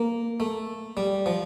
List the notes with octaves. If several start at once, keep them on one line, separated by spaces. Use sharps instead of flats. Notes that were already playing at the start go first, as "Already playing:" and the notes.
Already playing: A#3
A3
G3
F3